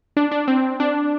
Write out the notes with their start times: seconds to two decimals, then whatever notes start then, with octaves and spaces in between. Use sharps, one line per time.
0.17 D4
0.32 D4
0.48 C4
0.80 D4